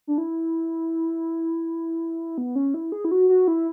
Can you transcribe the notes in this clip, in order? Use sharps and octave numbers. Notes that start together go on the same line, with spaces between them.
D4
E4
B3
C#4
E4
G#4
E4
F#4
F#4
E4